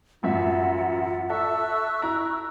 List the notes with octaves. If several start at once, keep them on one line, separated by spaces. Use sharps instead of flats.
A1 F#2 F4 E5 F#5
A4 E5 C#6 E6 F#6
E4 A#5